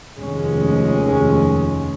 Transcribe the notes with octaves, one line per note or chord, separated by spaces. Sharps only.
F1 D#2 G#3 C#4